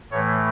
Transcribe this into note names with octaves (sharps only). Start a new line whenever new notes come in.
A2 E3 A3 C#5